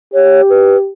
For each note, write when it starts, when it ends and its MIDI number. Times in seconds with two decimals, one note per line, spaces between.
0.14 0.89 67
0.14 0.41 73
0.50 0.77 71